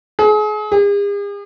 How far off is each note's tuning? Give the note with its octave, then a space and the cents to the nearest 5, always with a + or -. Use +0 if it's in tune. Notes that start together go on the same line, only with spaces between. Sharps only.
G#4 +35
G#4 -45